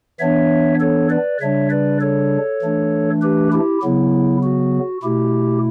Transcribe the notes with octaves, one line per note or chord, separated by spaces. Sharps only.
E3 B3 D4 C#5 E5
A4 C#5
B4 D5
C#3 G3 D4 C#5 E5
B4 D5
A4 C#5
E3 A3 D4
G4 B4
E4 G4
C#3 F#3 B3 E4
F#4
B2 A3 E4 G4